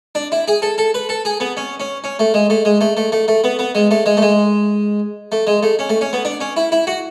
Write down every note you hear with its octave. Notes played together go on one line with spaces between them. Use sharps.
D4
E4
G#4
A4
A4
B4
A4
G#4
B3
C#4
C#4
C#4
A3
G#3
A3
G#3
A3
A3
A3
A3
B3
B3
G#3
A3
G#3
A3
G#3
A3
G#3
A3
C#4
A3
C#4
B3
D4
C#4
E4
E4
F#4